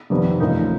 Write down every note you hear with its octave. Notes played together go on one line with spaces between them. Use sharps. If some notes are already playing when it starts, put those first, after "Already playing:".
F2 C3 D#3 G3 B3
A1 A2 F3 A#3 D#4